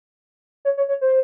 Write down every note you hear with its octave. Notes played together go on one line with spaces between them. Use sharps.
C#5
C#5
C#5
C5